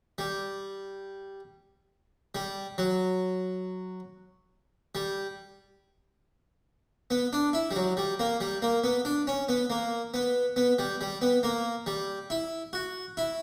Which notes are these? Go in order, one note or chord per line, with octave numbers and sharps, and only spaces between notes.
G3
G3
F#3
G3
B3
D4
E4
G3
F#3
G3
A#3
G3
A#3
B3
D4
C#4
B3
A#3
B3
B3
G3
G3
B3
A#3
G3
E4
F#4
E4